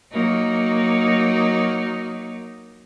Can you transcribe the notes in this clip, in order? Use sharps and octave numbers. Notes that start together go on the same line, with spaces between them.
F#3 A#3 D#4